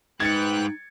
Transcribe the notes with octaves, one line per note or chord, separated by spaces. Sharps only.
G#2 D#4 B4 G5 F#6 G#6 A6 C#7